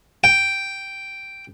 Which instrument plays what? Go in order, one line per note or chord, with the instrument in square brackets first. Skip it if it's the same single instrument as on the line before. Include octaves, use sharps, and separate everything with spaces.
[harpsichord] G5